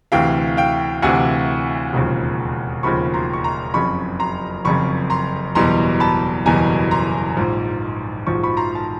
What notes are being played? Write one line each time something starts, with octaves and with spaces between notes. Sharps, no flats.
D2 C3 E3 F5 G5
F5 G5
D2 C3 E3 F#5 G#5
E1 D#2 C#3 F3
E1 D#2 C#3 F3 B5 C#6
A#5 C6
C#6
A#5 C6
F#1 F2 C#3 B5 C#6
A#5 C6
F#1 F2 C#3 B5 C#6
A#5 C6
F#1 E2 B2 G3 A#5 C6
A5 B5
F#1 E2 B2 G3 G#5 A#5
A#5 C6
A#1 G#2 F3
A#1 G#2 F3 C#6
B5 C#6
A#5 C6
A5